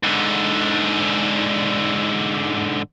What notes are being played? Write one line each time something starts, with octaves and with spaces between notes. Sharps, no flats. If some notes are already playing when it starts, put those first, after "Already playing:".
G#2 D3